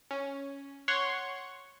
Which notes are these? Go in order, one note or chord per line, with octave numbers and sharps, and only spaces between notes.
C#4
C#5 F#5 C6 C#6